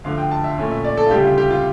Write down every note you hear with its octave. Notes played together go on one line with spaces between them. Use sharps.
D2 D3 F3 F5
G5
A5
E5
A#2 A3 C#4
E5
D5
A4
F4
D2 C#3 G3 G4
F4
G4
F4